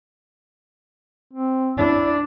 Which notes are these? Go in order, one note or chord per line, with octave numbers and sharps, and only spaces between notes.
C4
D4 E4